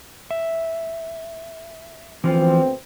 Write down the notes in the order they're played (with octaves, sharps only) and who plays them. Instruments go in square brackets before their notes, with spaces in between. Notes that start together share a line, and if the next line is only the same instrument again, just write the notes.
[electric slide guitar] E5
[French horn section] D2 B3 C4 [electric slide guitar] E3 F3 F4